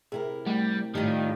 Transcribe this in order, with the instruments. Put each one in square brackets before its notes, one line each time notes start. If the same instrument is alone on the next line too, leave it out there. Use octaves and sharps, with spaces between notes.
[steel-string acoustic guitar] C3 E4 A#4 [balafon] G#4
[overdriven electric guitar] G3 [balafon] A3
[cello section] A2 [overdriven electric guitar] D#3 [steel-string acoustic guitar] G3 F4